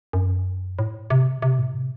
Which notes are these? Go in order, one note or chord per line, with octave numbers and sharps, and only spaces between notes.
F#2
A2
C3
C3
A2
C3